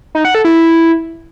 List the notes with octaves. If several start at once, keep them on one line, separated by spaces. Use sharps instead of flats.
D#4
F#5
A4
E4